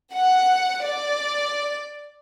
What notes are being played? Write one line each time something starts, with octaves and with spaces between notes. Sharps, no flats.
F#5
D5